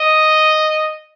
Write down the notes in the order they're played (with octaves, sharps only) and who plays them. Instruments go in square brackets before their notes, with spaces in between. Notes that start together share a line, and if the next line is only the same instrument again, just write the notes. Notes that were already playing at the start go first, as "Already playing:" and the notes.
Already playing: [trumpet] D#5